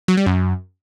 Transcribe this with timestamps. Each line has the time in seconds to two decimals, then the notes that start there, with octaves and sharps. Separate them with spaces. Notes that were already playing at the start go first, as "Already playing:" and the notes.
0.08 F#3
0.17 G3
0.26 F#2